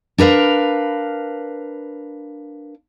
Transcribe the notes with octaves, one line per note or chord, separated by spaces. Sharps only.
D4 A#4 B4 F5